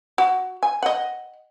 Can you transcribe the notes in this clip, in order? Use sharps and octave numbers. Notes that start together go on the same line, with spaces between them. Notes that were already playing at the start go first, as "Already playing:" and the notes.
F#4
G#5
D#5 F#5